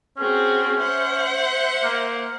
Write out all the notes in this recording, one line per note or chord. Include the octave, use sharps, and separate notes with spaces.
C4 C#4 F#4 G#4
C5 E5 F#5
A#3